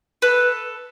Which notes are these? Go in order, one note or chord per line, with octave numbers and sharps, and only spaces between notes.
A4 B4